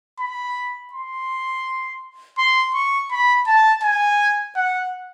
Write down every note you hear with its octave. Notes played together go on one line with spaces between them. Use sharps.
B5
C6
C6
C#6
B5
A5
G#5
F#5